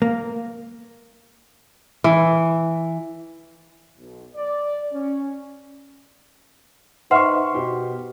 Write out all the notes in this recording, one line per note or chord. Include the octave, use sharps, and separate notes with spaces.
A#3
E3
B1
D5
C#4
D#4 B4 C5 E5 F#5 C6 C#6 F6
B2 G4